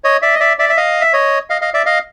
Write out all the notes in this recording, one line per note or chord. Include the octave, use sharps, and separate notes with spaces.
C#5 D#5
D5 E5
D#5
D5 E5
D5 E5
E5
D#5 F5
E5
C#5 D#5
D#5 F5
D#5 F5
D5 E5
D#5 F5